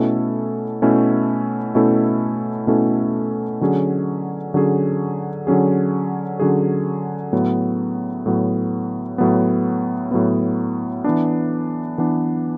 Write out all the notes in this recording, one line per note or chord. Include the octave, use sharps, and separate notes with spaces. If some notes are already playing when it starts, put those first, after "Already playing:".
Already playing: B2 A3 C#4 E4 A4
B2 A3 C#4 E4 A4
B2 A3 C#4 E4 A4
B2 A3 C#4 E4 A4
D3 F#3 C#4 G#4
D3 F#3 C#4 G#4
D3 F#3 C#4 G#4
D3 F#3 C#4 G#4
A2 F#3 B3
A2 F#3 B3
A2 F#3 B3
A2 F#3 B3
E3 B3 D4
E3 B3 D4